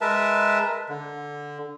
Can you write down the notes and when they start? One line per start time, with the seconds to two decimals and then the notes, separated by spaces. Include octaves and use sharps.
0.01 G#3 A#4 B4 E5 A5
0.89 D3